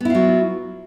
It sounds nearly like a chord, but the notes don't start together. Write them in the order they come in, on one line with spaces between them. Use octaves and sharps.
B3 E4 F4 F#3